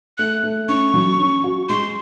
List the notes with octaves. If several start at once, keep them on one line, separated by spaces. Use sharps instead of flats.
A3 F#6
A3
C#4 C#6
F#3
C#4
F#4
G#3 C6